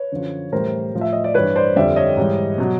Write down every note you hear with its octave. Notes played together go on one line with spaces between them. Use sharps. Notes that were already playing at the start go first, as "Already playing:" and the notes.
Already playing: B4 C#5
F#2 D3 F3
A2 E3 G3 A#4 C5
A2 F3
E5
D#5
D5
G2 E3 G3 B4 C#5
C5 D5
F2 D3 G3 D5 E5
C#5 D#5
G#2 E3 G3
B2 F#3